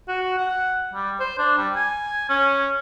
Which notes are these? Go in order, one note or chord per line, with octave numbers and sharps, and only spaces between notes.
F#4
F#5
G3
C5
D4
G3
G#5
C#4